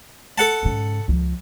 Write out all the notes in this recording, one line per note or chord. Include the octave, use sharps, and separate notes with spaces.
A4 F#5 A5
G#2 C#3
C#2 F3